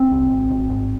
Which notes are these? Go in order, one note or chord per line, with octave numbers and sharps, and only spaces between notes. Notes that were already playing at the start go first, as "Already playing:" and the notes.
Already playing: C4
C2
G#1
G#1
G#1